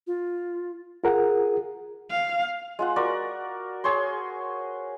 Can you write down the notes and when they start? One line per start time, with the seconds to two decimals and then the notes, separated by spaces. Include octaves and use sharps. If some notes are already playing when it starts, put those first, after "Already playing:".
0.07 F4
1.04 F4 G#4 A#4 F#5
2.10 F5
2.79 G#3 F4 F#5
2.96 F#4 A#4 D5
3.84 G#4 C5 C#5 C6